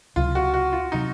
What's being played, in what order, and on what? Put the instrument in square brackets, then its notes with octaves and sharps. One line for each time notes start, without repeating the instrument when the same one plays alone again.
[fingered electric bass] C#2 C3 F#3 [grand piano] F4
[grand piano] F#4
F#4
F4
[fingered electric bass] C3 F#3 [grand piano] D#4